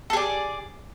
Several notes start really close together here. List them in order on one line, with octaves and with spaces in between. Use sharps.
A4 G#4 D5